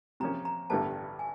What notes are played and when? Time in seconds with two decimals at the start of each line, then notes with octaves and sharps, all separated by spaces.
0.20 C3 F3 A#3 C#4 A#5
0.45 A#5
0.70 A1 G2 D3 G3 B3 A5
1.19 G#5